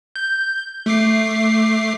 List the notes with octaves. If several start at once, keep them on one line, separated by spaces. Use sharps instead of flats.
G6
A3 D6 C7